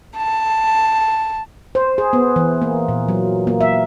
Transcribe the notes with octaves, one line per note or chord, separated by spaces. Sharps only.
A5
C5
G#4
B3
E3
A#3
A#2
F#3
A#3
E5